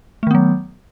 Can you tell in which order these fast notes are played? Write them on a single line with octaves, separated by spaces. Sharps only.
A3 D#3 B3 F#3